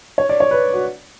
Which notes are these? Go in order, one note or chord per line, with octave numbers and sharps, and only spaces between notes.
C#5
D5
C#5
B4
F#4